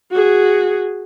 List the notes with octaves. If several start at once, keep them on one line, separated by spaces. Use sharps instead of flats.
F#4 G#4